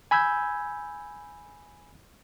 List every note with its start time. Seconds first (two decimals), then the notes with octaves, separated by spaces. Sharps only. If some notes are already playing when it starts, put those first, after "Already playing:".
0.11 G#5 B5 E6 G6 G#6